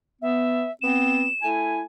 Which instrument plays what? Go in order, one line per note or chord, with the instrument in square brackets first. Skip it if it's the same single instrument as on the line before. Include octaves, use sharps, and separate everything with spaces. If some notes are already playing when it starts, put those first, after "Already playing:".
[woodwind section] B3 [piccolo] E5
[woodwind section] B3 C4 [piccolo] E7
[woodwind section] A3 E4 G#5